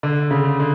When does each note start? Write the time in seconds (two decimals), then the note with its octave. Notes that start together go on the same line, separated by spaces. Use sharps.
0.03 D3
0.31 C#3
0.60 D3